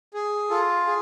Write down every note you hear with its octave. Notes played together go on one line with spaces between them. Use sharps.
G#4
F4 A4
G#4